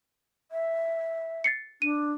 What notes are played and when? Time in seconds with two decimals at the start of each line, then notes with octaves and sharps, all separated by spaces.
0.52 E5
1.44 A6 C7 C#7
1.82 D4 D#7